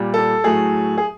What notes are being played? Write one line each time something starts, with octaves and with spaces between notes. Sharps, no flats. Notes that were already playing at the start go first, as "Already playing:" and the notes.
Already playing: A#2 G3
A4
A2 F#3 A3 G#4
G#4